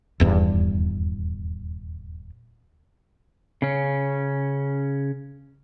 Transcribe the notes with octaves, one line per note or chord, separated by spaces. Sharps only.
D#1 E2 G2
C#3 C#4